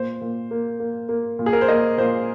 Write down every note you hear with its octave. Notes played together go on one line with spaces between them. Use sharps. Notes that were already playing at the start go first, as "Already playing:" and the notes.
Already playing: A#2 C5
A#2
A#3
A#3
A#3
A#2
G#4
A#4
C5
A#3 D#5
A#2 C5